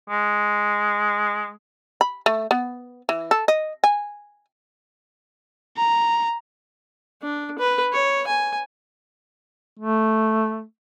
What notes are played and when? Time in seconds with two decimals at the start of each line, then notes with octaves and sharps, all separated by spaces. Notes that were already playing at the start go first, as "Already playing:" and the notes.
0.10 G#3
2.01 B5
2.26 A3
2.51 B3
3.09 E3
3.31 A4
3.48 D#5
3.84 G#5
5.77 A#5
7.23 D4
7.59 B4
7.93 C#5
8.27 G#5
9.79 A3